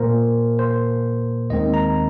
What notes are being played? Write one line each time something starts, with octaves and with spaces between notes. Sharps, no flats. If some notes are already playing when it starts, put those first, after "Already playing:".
Already playing: A#2 A#3 A#4 C5
C5
D#2 D#3 G#3 C4 D#5
A#5